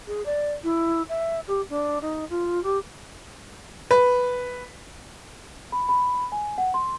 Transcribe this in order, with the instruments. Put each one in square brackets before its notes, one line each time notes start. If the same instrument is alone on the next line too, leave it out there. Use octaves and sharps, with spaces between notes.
[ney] G#4
D5
E4
E5
G4
D4
D#4
F4
G4
[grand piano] B4
[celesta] B5
B5
G#5
F#5
C6